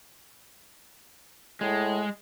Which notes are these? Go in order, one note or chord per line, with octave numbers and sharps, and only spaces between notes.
A2 G#3